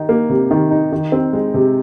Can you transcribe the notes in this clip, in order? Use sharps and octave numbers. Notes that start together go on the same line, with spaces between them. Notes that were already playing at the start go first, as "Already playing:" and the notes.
Already playing: D#3 D#4
A#3
C3
D#3
D#4
D#3
C4
G#3
C3